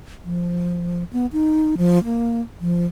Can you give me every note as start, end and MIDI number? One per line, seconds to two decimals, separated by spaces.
0.25 1.04 53
1.13 1.26 59
1.33 1.75 63
1.78 2.02 53
2.04 2.41 58
2.61 2.86 53